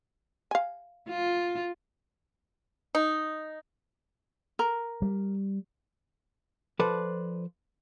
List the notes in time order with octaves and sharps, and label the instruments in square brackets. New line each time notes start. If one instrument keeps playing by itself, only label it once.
[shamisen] F5 G#5
[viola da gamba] F4
[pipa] D#4
[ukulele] A#4
[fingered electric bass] G3
[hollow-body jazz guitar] F3 A4 B4 C5 D5